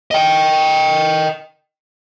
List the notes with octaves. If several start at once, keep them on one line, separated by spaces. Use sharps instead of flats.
D#5 G5